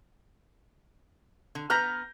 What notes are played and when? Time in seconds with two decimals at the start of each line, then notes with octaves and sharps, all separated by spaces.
1.55 D3
1.70 B3 B4 A#5 F6 G6 A#6